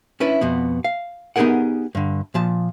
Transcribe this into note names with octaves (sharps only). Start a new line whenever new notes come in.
C#4 D4 E4 B4
F2 B2 B3
F5
B3 D#4 G4 G#4 A#4 F#5
G2 D3
A#2 F3 A5